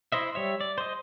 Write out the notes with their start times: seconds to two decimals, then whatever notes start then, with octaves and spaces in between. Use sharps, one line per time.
0.12 E4 C5 D#5 E5
0.35 G3 C#5 E5
0.61 D5
0.78 C5 D#5